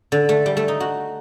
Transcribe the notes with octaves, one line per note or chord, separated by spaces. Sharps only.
D3
A3
G3
A3
D#4
F#4